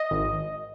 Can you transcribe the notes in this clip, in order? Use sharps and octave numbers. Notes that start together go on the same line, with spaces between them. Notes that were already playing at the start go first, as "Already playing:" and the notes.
Already playing: D#5
G#1